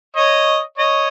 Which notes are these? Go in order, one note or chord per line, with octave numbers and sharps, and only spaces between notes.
C#5 D#5
C#5 D#5